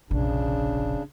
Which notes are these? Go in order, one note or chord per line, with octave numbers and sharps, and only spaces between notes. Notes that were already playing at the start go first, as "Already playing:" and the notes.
F1 A#1 C#3 D4